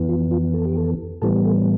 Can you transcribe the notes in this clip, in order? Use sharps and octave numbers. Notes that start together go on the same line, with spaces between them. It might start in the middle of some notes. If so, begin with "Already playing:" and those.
Already playing: F2 E3 B3
F4
F4
A4
G4
A4
A2 E3 G3 B3 A4
A4